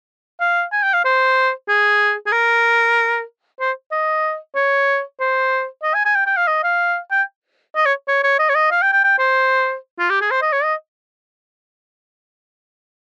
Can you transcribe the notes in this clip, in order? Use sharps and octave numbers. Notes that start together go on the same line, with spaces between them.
F5
G#5
G5
F5
C5
G#4
G#4
A#4
C5
D#5
C#5
C5
D#5
G#5
G#5
G5
G5
F5
D#5
F5
G5
D#5
C#5
C#5
C#5
D#5
C#5
D#5
F5
G5
G5
G5
C5
F4
G4
G#4
C5
D#5
C#5
D#5